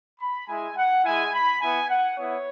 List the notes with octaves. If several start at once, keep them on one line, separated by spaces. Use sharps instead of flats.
B5
G#3 E4 G#5
F#5
G#3 E4 G#5
B5
B3 E4 G#5
F#5
B3 E4 C#5